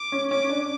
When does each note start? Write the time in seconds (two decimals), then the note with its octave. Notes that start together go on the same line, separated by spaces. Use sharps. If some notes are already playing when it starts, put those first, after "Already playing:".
Already playing: D6
0.12 C#4
0.31 C#4 D6
0.49 D4